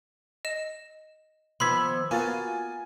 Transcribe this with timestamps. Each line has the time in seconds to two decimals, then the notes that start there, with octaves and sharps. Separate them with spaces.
0.45 D#5 E7
1.60 D#3 F3 B3 B5 C6 E6 G#6 B6
2.11 A#3 B3 F4 F#4 G#5 A6